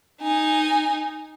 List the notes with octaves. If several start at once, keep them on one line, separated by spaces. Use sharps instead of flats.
D#4 G#5